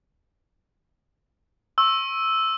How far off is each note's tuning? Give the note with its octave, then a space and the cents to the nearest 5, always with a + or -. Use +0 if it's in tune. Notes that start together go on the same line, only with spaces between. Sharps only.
C#6 -40 E6 -5